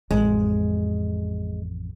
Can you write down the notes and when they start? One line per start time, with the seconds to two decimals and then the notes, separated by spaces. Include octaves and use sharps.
0.11 A1 F2 G#3